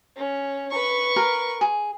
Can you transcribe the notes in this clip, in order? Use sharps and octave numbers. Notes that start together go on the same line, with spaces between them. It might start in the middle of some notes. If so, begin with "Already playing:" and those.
C#4
B4 C#6
A#4
G#4